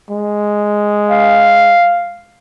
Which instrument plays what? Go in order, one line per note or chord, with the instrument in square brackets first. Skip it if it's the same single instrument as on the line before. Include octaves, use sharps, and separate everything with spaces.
[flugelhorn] G#3
[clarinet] F5